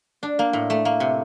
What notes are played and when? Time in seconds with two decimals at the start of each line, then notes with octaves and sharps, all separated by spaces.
0.23 D4
0.39 A#3
0.53 A2
0.70 A3
0.85 A#3
1.00 C3